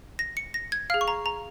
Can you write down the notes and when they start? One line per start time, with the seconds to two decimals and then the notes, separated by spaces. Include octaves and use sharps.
0.19 A#6
0.37 C#7
0.54 A#6
0.72 G#6
0.90 G#4 F5 F6
1.01 C#6
1.08 A#5
1.26 A#5